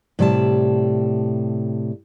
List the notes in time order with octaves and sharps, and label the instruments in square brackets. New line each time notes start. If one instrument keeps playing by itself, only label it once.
[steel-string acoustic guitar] A2 C3 G3 E5 A5